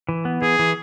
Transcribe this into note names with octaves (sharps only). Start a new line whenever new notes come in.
E3
B3
E3 G#4
E3